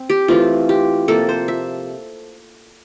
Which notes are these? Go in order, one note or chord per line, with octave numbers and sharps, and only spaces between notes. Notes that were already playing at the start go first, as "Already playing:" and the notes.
Already playing: C4
G4
E3 A3 C4 F4
G4
C3 F3 A#3 A4
C5
E5